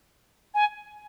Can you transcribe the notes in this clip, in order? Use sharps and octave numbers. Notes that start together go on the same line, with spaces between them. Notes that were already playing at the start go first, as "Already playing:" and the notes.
G#5